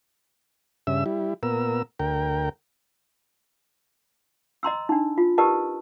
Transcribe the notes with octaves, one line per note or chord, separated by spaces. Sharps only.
G2 C#3 E5 E6
G3 E4
A#2 B3 A#4 E6
D2 A#4 G5
D#5 A#5 C6 E6
D4 D#4
F4
G4 A#4 B4 D#5 A5